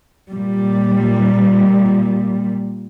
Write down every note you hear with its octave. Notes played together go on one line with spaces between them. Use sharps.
A#2 G3